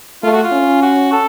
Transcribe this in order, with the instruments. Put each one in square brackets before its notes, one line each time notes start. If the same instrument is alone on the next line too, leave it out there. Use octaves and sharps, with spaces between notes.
[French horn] A3 [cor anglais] F4
[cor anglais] F#4
F4
[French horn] C#4
[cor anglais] F#4
A4